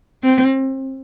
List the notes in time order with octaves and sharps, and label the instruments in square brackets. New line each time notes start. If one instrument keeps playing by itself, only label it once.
[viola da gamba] C4